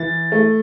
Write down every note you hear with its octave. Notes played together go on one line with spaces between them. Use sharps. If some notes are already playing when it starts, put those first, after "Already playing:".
Already playing: E3 A6
A3